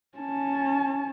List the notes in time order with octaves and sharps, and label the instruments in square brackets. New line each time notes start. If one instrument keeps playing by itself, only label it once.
[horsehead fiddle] C#4 A5